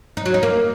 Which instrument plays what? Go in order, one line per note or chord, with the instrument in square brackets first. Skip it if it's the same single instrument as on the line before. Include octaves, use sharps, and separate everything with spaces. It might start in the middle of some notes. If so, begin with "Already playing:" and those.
[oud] D#4
F#3
D#4
A#3